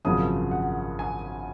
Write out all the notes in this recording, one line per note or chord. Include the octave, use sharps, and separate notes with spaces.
G#1 F#2 C#3 F3 D#6
F#5
G#5